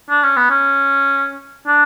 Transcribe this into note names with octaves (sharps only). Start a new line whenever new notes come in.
D4
C#4
B3
C#4
D4